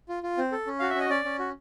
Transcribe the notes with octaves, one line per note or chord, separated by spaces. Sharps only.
F4
F4
C4
A4
C#4
F#4 F5
E5
C#4
D#5
C#4 D5
C#4
F#4